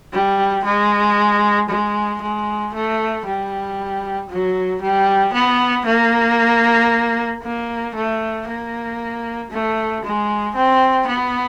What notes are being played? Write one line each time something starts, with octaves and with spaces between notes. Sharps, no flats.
G3
G#3
G#3
G#3
A3
G3
F#3
G3
B3
A#3
A#3
A3
A#3
A3
G#3
C4
B3